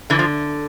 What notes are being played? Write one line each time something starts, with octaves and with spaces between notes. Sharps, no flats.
D3 E3
F3